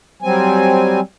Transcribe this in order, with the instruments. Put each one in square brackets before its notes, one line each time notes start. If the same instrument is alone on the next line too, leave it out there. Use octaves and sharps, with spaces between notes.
[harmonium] F#3 G3 C4 G#5